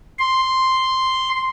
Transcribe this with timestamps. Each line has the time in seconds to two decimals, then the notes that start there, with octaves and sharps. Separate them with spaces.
0.19 C6